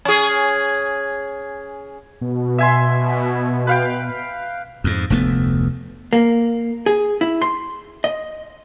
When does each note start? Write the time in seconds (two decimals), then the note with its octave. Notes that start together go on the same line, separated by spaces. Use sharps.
0.05 C#4 G#4
2.21 B2
2.58 E5 G#5 C6
3.67 B4 F5 G5
4.84 F2 G#2
5.10 F1 D2 A3 B3
6.13 A#3
6.86 G#4
7.21 E4
7.42 C6
8.04 D#5